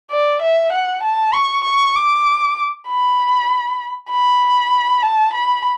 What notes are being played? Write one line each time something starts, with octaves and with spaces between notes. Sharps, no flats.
D5
E5
F#5
A5
C#6
C#6
D6
B5
B5
A5
B5